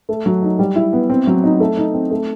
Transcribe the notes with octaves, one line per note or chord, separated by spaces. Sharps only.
A3
F#3
D#4
G3
E4
B3
C4
F#3
D#4
A3
D#4
C4
A3